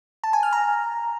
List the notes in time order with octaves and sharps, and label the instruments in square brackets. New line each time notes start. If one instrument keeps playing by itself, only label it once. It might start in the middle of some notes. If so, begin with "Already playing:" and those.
[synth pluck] A5
G#5
F6
A#5